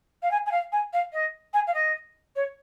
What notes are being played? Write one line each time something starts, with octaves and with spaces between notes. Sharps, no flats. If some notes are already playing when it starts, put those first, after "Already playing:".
F5
G#5
G#5
F5
G#5
F5
D#5
G#5
F5
D#5
C#5